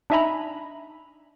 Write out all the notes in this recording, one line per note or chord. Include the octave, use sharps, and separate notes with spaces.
D4 D#4 E5 G#5 A#5 B5